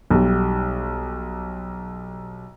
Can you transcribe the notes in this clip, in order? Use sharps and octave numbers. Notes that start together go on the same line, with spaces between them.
B1 G3